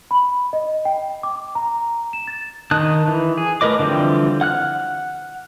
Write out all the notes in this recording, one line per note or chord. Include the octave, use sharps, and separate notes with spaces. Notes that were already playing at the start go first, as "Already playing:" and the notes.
B5
D#5
G5
D6
A#5
E7
A6
D#3 D#4 A5 D#6 F#6
E3
G#4
A3 A#4 B4 D#5 D6
D3 E3 F3 G3 C4
F#5 F6 F#6